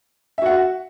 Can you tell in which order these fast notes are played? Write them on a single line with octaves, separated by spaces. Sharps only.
E5 F#4 F#5